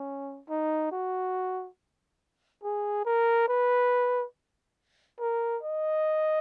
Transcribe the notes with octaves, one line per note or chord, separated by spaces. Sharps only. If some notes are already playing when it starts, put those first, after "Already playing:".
Already playing: C#4
D#4
F#4
G#4
A#4
B4
A#4
D#5